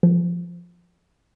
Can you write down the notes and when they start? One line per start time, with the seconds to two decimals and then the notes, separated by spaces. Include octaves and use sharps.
0.03 F3